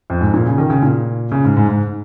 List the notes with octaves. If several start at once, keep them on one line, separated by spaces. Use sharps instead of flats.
F2
G#2
A#2
C#3
D#3
C#3
A#2
C#3
G#2
G#2
G#2